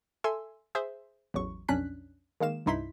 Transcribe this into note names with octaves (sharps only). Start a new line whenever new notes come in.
A4 E5 G#5 C6 E6
G#4 C5 E5
A1 E2 F#3 C#6
B1 F2 C#4 D4 F#6 B6
D#3 G#3 A#3 F5 E7
C2 G2 D#4 E4 C6 B6